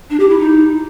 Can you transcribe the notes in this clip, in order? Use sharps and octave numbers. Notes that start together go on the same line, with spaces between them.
D4
G4
E4
D#4